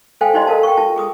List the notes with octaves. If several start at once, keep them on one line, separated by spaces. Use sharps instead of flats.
A4 C5 F5 G5 G#5
E4 G4 C5 D5 D#5 C6
A4 A#4 F5 A5
G5 C#6
F4 A5
G#4 D6 D#6